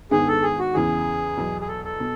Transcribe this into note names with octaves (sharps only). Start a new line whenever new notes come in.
G#2 D#3 G#3 B3 D4 G#4
A4
G#4
F#4
E2 C#3 E3 G#4
E2 B2 F#3
G#4
A4
A4
B2